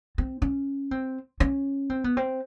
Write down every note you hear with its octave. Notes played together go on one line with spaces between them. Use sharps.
C4
C#4
C4
C#4
C4
B3
C4